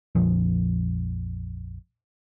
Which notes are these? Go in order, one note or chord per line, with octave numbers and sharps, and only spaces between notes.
A#1 F2 A#2 F3